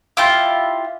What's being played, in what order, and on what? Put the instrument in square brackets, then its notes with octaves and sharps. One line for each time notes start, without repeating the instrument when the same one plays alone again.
[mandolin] E4 F4 G4